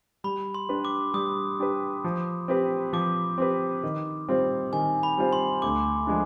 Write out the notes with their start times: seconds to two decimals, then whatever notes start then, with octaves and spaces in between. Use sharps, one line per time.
0.24 G3 B5
0.54 C6
0.69 D4 G4 B4
0.85 D6
1.14 G3 D#6
1.59 D4 G4 B4
2.04 F3
2.48 C4 G4 B4
2.93 F3 D6
3.38 C4 G4 B4
3.84 D#3
4.29 G3 C4 F4 C5
4.73 D#3 G#5
5.03 B5
5.17 G3 C4 F4 C5
5.33 C6
5.62 D2 D6
6.07 F3 G#3 D4